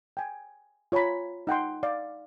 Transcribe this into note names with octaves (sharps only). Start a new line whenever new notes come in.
G5 G#5
F4 C#5 G#5 A#5 B5
D#4 F#5 G5 C6
D5 F5